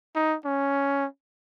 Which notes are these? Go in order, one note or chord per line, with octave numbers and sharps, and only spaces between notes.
D#4
C#4